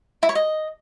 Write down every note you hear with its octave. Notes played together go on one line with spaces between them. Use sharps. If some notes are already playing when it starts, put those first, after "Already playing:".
E4
C#5
D#5